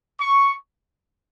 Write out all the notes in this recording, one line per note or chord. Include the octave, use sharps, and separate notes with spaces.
C#6